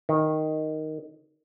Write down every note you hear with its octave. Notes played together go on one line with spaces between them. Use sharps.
D#3